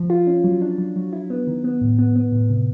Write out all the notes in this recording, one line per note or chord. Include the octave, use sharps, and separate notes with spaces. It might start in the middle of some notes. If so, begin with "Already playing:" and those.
Already playing: F3
F4
C#4
F#3
D4
F#3
F#3
E4
B3
D#3
B3
A2
B3
B3
A2
C3